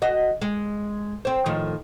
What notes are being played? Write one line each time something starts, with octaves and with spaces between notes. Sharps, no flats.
F#4 D#5
G#3
C4 C5
A2 D#3 F3